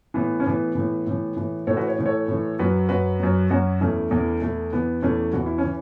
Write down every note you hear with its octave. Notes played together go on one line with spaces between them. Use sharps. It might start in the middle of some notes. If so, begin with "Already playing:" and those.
A2 E3 B3
C#4
A2 E3 B3
A2 E3
A2 E3
A2 E3
A2 E3 A4 C#5
F#4 B4
C#5
A2 E3
A4 C#5
A2 E3
F#2 F#3 F#4 B4
F#2 F#3 F#4 B4
F#2 F#3
F#2 F#3 C#4 F#4
E2 E3 A3 C#4
E2 E3
E2 E3 A3
E2 E3 B3
E2 E3 A3 C#4
E2 E3 F#4
E4
C#4
E3